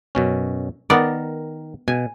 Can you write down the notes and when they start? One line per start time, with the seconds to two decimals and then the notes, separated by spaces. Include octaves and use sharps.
0.15 F#2 B2 C#4
0.90 D#3 B3 A#4 D5
1.88 B2 G#5